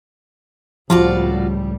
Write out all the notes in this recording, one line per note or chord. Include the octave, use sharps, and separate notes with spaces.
C#2 A2 F3 G3 F4 F#4 D5